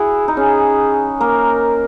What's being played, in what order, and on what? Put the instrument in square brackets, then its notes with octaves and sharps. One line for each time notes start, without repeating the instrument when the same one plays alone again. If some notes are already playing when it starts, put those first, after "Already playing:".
Already playing: [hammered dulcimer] E4 F#4 [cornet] G#4
[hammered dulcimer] D#4
[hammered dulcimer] C#4 [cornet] G#4
[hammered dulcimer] A#3 [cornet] A#4